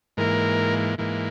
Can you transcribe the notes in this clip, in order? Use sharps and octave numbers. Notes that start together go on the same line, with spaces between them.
G#2 E3 A#3 A#4
G#2 E3 A#3